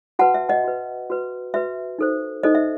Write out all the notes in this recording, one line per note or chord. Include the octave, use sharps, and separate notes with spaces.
F#4 B4 F#5 A5
E5
D#5 F#5
F#4 B4
F#4 B4
F#4 B4 E5
D#4 A4 C5
D#4 A4 C5 D#5
E5